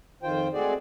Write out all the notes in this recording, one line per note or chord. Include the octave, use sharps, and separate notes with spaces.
F2 D#3 F4 C5 G5
G#3 A3 C4 F#4 G#4 D5